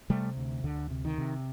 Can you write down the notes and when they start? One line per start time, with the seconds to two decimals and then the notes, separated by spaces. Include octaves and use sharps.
0.10 C3 G3 A3
0.37 D2
0.64 D2 D3
0.90 C3
1.05 D#3
1.18 C3